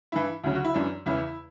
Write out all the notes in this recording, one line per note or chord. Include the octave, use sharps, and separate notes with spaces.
G2 E3 E4
D2 C#3 F#3
F#4
E4
F#2 E3 D4
E2 C#3 E3 E4